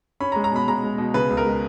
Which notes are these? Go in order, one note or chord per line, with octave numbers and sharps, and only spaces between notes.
C#4 B5
A#5
G#3
A#5
B2 B5
G#3 A#5
G#3
B2
C#3 B4
C#2
A#4
G#3